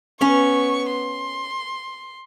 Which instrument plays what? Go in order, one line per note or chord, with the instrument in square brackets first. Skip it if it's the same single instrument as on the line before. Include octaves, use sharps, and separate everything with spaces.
[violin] B3 C#6 [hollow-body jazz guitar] C#4
[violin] C6